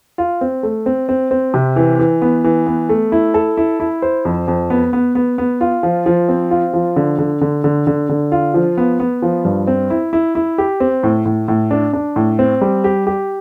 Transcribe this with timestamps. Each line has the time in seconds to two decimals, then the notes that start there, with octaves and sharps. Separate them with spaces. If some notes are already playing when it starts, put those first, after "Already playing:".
0.18 F4
0.41 C4
0.63 A3
0.86 C4
1.09 C4
1.31 C4
1.54 C3
1.76 E3
1.99 E3
2.22 B3
2.44 E3
2.67 B3
2.89 A3
3.12 E4
3.34 A4
3.57 E4
3.80 E4
4.02 C5
4.25 F2
4.48 F2
4.70 B3
4.93 B3
5.15 B3
5.38 B3
5.61 F4
5.83 F3
6.06 F3
6.29 C4
6.51 F4
6.74 F3
6.96 D3
7.19 D3
7.41 D3
7.64 D3
7.87 D3
8.09 D3
8.32 F4
8.54 F3
8.78 B3
9.00 B3
9.22 F3
9.45 G2
9.67 C4
9.90 E4
10.13 E4
10.35 E4
10.58 G4
10.80 C4
11.03 A2
11.25 A2
11.48 A2
11.71 D4
11.93 D4
12.16 A2
12.39 C4
12.61 G3
12.84 G4
13.07 G4